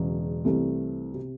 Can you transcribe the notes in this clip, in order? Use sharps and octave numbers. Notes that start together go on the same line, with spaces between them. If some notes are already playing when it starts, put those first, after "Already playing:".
Already playing: E1 E2 C#3 F#3
C2 C3 E3 A3 C4
C3